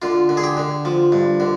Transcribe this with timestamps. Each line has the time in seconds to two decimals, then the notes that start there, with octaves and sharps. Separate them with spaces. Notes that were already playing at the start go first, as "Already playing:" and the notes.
0.02 D3 F4
0.29 D3
0.37 G#4
0.44 G4
0.57 D3
0.85 F3
1.12 G2
1.40 D3